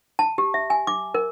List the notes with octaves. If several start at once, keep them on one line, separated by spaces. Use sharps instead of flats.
A5
G4
E5
G#5
D6
A#4